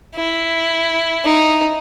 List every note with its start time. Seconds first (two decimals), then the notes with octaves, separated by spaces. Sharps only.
0.15 E4
1.25 D#4